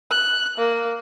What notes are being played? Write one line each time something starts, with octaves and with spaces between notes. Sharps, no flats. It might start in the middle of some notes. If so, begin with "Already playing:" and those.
F#6
A#3